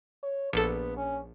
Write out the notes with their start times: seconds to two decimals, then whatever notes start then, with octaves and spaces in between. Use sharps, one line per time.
0.23 C#5
0.53 A#1 B3 A4
0.97 C#4